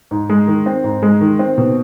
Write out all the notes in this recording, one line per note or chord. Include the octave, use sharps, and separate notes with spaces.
G#2
G#3
D#3
C4
G#2
G#3
D#3
C4
B2